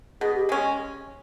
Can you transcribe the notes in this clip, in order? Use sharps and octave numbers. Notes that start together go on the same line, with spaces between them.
B2 G#4
G4
G#3 C#4